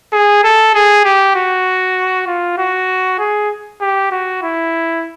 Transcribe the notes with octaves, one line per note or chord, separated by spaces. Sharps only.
G#4
A4
G#4
G4
F#4
F4
F#4
G#4
G4
F#4
E4